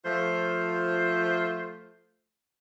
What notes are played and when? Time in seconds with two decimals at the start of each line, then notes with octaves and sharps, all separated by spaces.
0.05 F3 A3 F4 C5